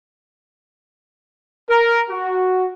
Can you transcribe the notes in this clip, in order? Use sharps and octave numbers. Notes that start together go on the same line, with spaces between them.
A#4
F#4